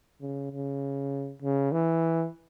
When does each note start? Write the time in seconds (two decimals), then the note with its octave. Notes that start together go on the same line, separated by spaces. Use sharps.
0.21 C#3
0.52 C#3
1.42 C#3
1.72 E3